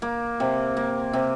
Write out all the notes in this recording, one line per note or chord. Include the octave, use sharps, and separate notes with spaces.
A#3
C3
A#3
C3